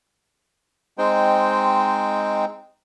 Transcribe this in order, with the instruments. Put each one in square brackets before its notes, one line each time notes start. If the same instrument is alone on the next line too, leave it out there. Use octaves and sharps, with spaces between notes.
[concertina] G#3 C4 D#4 C5 G5